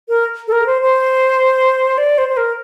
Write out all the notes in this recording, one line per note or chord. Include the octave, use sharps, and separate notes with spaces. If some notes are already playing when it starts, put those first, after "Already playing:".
A#4
A4
A#4
C5
C5
D5
C5
C5
A#4